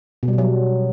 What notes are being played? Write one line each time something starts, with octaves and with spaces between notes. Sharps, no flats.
B2
G3
B2
F#3